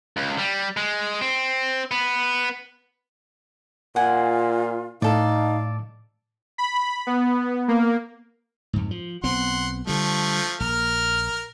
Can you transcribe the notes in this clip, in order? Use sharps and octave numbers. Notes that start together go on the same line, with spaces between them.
C#2
G3
G#3
C4
B3
A#2 F4 F#5 G#5
A2 D#4 A4 D5 F5
B5
B3
A#3
F2 G#2
F3
B1 B3 C4 F#5 C6
D3 F3 G3 A3
A#1 A#4 F6